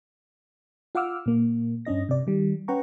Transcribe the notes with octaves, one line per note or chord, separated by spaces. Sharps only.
F4 F5 F#5 D6 E6 F6
A#2 A#3
G2 C#4 D4 D#5 A#6
C3 D5
D#3 G3
C#4 B4 F#5 G5 A#5 C#6